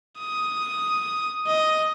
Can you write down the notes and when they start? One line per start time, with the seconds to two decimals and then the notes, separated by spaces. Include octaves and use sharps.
0.19 D#6
1.47 D#5